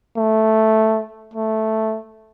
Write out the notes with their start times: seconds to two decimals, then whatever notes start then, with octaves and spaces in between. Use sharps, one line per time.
0.17 A3
1.34 A3